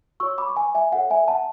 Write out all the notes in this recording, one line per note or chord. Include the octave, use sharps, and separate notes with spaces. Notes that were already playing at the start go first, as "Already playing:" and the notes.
F#4 C#5 C#6 E6
B5 D6
C#6
G#5 B5
E5 G#5
F#4 A4 C#5 F#5
E5 G#5
F#5 A5